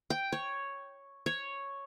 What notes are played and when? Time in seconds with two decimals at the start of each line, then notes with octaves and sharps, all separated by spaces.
0.10 G5
0.32 C#5
1.26 C#5